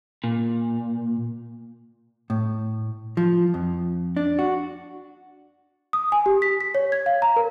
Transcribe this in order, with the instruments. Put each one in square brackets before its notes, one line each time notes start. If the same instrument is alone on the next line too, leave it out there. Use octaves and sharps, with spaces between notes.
[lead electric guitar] A#2
[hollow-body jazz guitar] A2
F3
F2
D4
F#4
[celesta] D#6
G#5
G4
B6
B6
C#5
G#6
F5
A#5
A#4